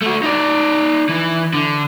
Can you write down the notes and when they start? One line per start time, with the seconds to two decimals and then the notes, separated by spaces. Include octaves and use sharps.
0.02 A3 F#4
0.23 D#4 D5
1.09 E3
1.54 D3